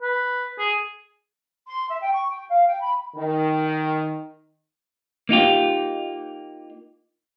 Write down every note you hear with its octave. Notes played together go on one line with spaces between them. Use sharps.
B4
G#4
C6
E5
G5
C#6
G5
F5
G5
B5
D#3
A#3 D#4 F4 G4